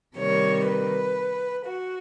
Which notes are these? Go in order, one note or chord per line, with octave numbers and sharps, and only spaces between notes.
C3 D#3 G3 A#3 C#5
B4
F#4